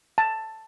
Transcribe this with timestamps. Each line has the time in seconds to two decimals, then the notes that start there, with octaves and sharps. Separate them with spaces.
0.18 A5